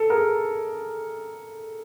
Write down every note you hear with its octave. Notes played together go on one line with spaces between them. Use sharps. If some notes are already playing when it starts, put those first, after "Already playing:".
Already playing: A4
G#4 A#4